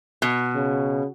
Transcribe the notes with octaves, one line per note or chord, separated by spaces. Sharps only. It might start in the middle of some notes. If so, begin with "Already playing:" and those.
B2
C#3